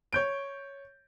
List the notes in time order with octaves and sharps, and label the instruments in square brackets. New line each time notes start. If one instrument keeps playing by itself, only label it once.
[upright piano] C#5 G6 D7